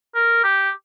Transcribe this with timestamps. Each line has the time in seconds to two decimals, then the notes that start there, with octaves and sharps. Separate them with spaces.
0.15 A#4
0.44 G4